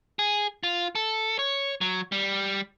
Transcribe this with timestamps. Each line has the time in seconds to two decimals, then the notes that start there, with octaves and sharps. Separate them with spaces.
0.19 G#4
0.63 F4
0.95 A4
1.39 C#5
1.81 F#3
2.12 G3